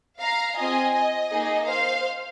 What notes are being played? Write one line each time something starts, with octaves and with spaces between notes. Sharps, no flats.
F5 A#5
C4 F4 G#4 D#5 G#5
D#5
A#3 D#4 G#4
C5 F5